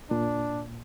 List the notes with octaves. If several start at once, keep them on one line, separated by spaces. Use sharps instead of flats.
A#2 D4